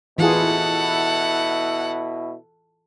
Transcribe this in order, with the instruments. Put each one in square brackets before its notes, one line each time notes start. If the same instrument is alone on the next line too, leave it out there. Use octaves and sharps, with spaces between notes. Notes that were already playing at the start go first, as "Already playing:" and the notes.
[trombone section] B2 E4 [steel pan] E3 F4 G#4 [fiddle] A4 F#5